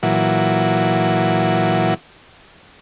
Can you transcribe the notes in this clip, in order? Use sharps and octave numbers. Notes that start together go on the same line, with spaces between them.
A#2 E3 F#3